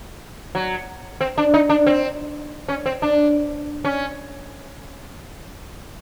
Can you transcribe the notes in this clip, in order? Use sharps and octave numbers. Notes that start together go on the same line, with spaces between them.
F#3
C4
D4
D#4
D4
C4
C#4
C4
D4
C#4